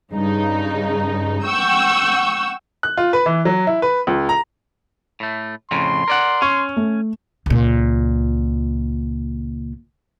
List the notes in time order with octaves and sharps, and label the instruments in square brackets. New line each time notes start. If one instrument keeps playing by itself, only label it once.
[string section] G2 C#3 D#4
F#5 G5 C#6 E6 G6
[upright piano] F#6
F4
B4
E3
F#3
E4
B4
C#2
A#5
[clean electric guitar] A2 A3
[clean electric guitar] F2 A2 C#3 [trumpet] C6
[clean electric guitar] A#4 D5 F#5
[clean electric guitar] C#4 [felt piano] C#6
[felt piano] A3
[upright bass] C#2 A#2